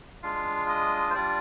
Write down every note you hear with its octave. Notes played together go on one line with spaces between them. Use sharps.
G#3 D4 F4 F5
D#5
C5
G3 D4 F4 D5